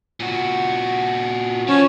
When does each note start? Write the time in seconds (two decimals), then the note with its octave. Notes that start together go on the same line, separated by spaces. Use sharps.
0.20 A#2 F#4
1.68 F3 C#4